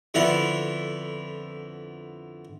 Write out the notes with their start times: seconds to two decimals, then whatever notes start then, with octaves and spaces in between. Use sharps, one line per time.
0.14 F2 D3 B3 E4